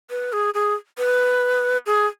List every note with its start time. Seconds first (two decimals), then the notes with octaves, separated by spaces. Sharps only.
0.10 B4
0.33 G#4
0.54 G#4
0.98 B4
1.86 G#4